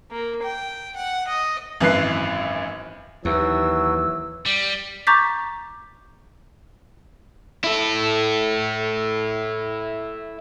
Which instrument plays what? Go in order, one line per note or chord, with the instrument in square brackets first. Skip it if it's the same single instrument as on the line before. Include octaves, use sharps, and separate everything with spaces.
[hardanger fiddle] A#3
G5
F#5
D#5
[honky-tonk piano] G#1 F#2 E3 B4 F#6 C7
[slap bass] D#2 [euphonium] E3 [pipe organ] F#3 [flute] E6
[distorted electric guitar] G3
[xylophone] A#5 C#6 D6 G6 A6 B6
[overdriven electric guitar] E4 A4